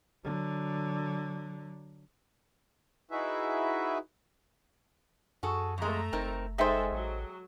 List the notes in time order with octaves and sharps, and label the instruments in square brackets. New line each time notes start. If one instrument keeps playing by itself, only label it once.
[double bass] D3 F#3
[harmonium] D#4 E4 F#4 G#4 B4 E5
[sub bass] F#2 [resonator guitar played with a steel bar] F#4 G#4 A4
[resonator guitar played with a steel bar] F2 G#3 [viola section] A3 A#5
[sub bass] F#1 [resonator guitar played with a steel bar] C4 D#4 A#4
[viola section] G#3 A4 [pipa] D#4 C5 [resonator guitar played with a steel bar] G#4 E5 G5
[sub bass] A1 [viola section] F#3